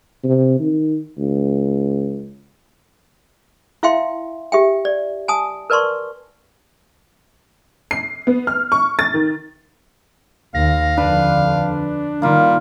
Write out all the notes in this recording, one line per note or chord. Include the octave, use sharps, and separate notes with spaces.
C3
D#3
C#2
E4 E5 F5 G5 C6
G4 E5 G5
D5
G#5 A5 D#6
A#4 B4 D5 A5 C6 C#6
C7
B3
F6
C#6
A6
D#3
D#2 F5 A#6
F2 D3 D4 B4
D#3 G3 A#3 F4